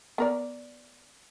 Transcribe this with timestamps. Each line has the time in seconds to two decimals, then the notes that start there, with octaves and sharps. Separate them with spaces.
0.18 B3 A#4 D5